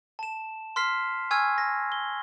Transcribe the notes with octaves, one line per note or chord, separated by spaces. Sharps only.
A5 E7
C6 F6 B6 C7
G#5 C#6 E6 F6 G#6
A#6
G7